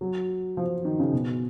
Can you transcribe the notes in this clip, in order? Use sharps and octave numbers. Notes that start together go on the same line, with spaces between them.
F#3
F3
D#3
C#3
B2